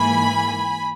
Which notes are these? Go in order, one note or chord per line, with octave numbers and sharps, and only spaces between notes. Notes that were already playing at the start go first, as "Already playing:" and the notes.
Already playing: G#2 E3 A#3 G#5 B5